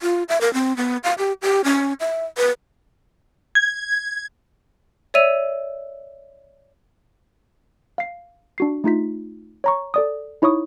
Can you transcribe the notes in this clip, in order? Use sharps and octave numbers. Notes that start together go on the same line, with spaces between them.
F4
E5
A#4
C4
B3
F5
G4
G4
C#4
E5
B4
G#6
C#5 D5 E5 E6 D#7 F7
F5 C7
D4 F#4 C7
A3 D#4 F4 B6
C#5 A#5 C#6
A4 D5 D#6
D#4 E4 C#5 C#6 D#6